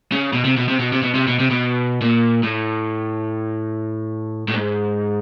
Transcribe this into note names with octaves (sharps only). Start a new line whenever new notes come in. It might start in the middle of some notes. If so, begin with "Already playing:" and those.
C#3
B2
C3
B2
C3
B2
C3
B2
C3
B2
C3
B2
A#2
A2
A2
G#2